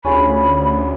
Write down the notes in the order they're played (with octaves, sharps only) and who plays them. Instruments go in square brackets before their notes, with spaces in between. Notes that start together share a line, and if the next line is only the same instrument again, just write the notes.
[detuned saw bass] D2 [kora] C#4 F4 G#4 [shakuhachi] B5